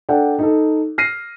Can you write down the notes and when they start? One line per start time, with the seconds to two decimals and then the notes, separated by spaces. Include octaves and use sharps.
0.09 D4 A4 F#5 G5
0.39 D#4 A4
0.98 F6 A#6 C7 D#7